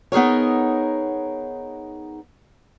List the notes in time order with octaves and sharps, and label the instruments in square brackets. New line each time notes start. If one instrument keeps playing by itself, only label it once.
[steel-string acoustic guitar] B3 D#4 G#4 A#4 C#5